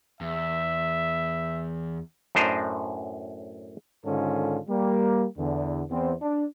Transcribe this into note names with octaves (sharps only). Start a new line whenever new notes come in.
E2 E5
F#2 A2 D4 C5 D#5 A#5
G#2 D3 D#3 C#4 F4 A4
G3 A#3
E2 D3
E2 C4
D4